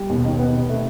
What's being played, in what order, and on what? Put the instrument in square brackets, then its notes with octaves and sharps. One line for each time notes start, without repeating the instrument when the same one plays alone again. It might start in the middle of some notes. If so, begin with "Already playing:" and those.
Already playing: [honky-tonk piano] G3
[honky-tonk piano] D#2 [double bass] B2
[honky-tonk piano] D#3
B3
C3
A3